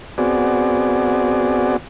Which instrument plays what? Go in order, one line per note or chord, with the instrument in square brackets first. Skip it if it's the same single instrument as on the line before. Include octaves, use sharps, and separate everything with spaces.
[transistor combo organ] B3 C4 F#4 G#4 D5